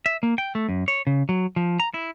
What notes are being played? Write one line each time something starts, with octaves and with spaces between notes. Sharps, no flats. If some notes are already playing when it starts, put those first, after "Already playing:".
E5
A#3
G5
A3
F#2
C#5
C#3
F#3
F3
A#5
E4